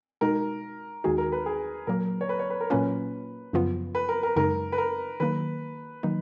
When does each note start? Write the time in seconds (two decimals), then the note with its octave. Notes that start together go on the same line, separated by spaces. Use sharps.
0.21 B2 G#3 D#4 F#4 A#4
1.04 D#2 D#3 G#3 D#4 F#4 G#4
1.18 A#4
1.32 B4
1.46 G#4
1.87 A#2 F#3 A#3 A#4
2.21 C#5
2.29 B4
2.39 C#5
2.50 B4
2.61 A#4
2.70 A#2 F#3 A#3 C#4 F4 B4
3.53 F#2 C#3 F3 B3 F4
3.95 B4
4.09 A#4
4.23 A#4
4.36 F#2 C#3 G#3 D#4 A#4
4.72 B4
4.78 A#4
5.20 D#3 F#3 A#3 B4
6.03 D#3 F#3 A#3 D#4